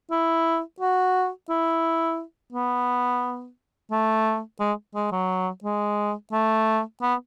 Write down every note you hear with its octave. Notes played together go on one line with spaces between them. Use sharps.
E4
F#4
E4
B3
A3
G#3
G#3
F#3
G#3
A3
B3